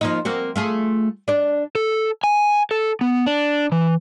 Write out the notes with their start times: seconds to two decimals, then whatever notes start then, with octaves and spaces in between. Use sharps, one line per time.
0.01 F3 A#3 D#4
0.25 A#3 C4 F#4
0.56 A3 F4 G#4
1.28 D4 D5
1.75 A4
2.24 G#5
2.71 A4
3.01 B3
3.26 D4
3.72 E3